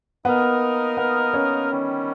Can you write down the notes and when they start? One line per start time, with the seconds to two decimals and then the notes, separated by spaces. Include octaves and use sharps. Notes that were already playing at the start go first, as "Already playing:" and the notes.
0.25 A#3 B3 D#4 A#4 D#5
0.97 B3
1.34 C#4
1.70 D#3 G3 C#4